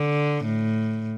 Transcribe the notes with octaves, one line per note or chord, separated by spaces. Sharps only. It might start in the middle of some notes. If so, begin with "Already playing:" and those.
Already playing: D3
A2